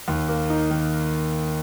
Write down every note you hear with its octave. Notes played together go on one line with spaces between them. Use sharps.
D#2
A#3
D#4
D#3